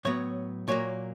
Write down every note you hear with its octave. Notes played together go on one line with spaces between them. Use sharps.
A2 F#3 B3 C#5
A#2 F#3 A#3 C#5